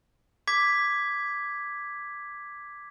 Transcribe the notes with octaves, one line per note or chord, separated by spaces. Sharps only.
D6 G#6 B6